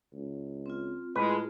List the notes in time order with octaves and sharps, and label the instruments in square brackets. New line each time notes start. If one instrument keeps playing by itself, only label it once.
[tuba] C#2
[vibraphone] C4 F4
[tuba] A2 [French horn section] G#3 [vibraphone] F4 G#4 A5 [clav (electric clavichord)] B4